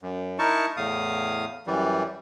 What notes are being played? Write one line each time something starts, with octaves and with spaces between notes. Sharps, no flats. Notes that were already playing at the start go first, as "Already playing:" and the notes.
F#2
D#4 E4 A#4 A5 C#6
E2 A2 F5 D#6
F#2 E3 G3